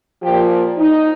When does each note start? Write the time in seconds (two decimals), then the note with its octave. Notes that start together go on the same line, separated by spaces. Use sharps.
0.22 A#2 F3 G4
0.78 D#4